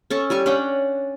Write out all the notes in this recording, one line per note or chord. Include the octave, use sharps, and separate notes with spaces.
C#4 A4 C#6
G3 G#5 C#6
C#4 D4 F#5 G5